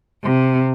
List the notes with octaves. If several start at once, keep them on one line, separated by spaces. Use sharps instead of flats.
C3